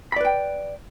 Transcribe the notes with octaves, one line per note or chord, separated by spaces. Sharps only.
B4 D5 G5 B5